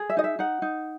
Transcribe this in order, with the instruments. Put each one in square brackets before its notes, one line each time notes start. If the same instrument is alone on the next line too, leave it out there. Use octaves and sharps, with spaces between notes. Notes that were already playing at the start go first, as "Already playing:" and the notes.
Already playing: [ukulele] G#4
E5
D#4 D#5
E5
D#4 F#5
D#4